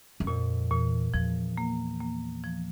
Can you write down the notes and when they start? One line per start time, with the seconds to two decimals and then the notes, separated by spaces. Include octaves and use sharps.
0.20 F#2
0.27 F2 A#2
0.71 E2 A#2
1.14 E2 F3
1.58 A#3
2.01 A#3
2.44 F3